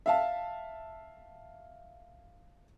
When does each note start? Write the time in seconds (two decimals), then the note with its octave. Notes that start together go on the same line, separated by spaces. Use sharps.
0.06 E5 F5 A5